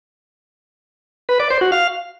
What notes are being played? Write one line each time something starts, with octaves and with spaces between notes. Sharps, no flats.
B4
D5
C5
F#4
F5